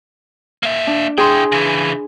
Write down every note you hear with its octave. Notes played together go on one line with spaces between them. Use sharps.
A#3 E5
D4
E4 G#4 G5 C6
C#3 E3